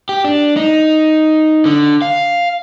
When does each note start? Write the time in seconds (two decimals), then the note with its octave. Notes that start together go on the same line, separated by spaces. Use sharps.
0.09 G4
0.24 D4
0.57 D#4
1.66 D3
2.02 F5